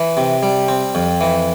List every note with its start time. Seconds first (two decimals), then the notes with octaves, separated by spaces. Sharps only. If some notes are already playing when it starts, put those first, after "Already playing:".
Already playing: E3
0.17 C3
0.43 G3
0.68 C4
0.95 F2
1.21 E3